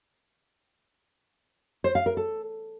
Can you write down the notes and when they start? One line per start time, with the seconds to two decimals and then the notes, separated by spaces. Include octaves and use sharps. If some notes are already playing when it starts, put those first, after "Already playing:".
1.84 C5
1.95 F5
2.06 A#4
2.17 A4